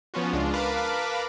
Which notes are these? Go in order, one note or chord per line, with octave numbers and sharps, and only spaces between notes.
F3 B3 C#4 F4 F#4
C#2 G#3 D4 F4
A#4 B4 F5 A5 B5 D6